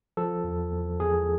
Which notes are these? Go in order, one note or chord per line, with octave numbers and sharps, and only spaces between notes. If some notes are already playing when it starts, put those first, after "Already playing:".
F3 A4
E2
E2
E2 G#4